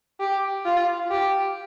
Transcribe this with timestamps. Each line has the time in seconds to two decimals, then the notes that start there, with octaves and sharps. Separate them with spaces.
0.20 G4
0.65 F4
1.11 G4